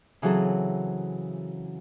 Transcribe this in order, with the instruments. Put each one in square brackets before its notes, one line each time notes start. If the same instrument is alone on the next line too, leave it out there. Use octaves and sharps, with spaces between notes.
[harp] C#3 E3 F#3 C4 G#4 A4